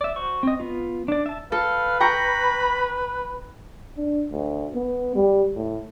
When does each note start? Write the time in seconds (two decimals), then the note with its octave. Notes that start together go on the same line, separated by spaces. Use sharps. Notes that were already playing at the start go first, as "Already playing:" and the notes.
0.01 D5 E5
0.16 F#4 C5 C#6
0.43 C4 D#5
0.60 B3 F4
1.08 D4 D5
1.26 E5 A5
1.52 A4 B4 F5
2.00 G5 A#5 B5 C#6
3.97 D4
4.32 D2
4.75 B3
5.15 G3
5.55 A2